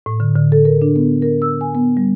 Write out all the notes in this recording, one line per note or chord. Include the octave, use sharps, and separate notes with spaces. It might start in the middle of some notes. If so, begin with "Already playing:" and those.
A2
D3
D3
A4
A#4
D4
B3
A#4
E6
G#5
B3
G3